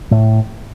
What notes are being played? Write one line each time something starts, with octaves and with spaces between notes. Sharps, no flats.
A2